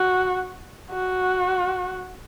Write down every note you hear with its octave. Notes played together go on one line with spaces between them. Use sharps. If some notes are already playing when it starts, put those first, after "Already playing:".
Already playing: F#4
F#4